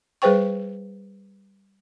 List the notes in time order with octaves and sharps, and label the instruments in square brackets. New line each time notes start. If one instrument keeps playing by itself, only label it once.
[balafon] G3 G#4 B4 C5 G5 C#6